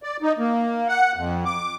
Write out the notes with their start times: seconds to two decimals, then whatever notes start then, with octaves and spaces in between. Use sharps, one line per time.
0.03 D5
0.22 D#4
0.39 A#3
0.88 F#5
1.16 F2
1.46 D6